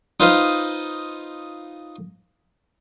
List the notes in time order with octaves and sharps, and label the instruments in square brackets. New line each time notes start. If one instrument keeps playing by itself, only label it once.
[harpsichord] D#4 F4 B4 C5 D#5 F5